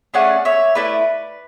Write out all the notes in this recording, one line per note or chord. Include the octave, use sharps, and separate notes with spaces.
A3 C#4 G#4 D5 F#5
C#5 E5
A3 E4 A4 B4 D5